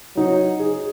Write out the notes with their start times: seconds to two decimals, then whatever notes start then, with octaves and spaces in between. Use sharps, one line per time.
0.16 F#3 D#4
0.60 G#4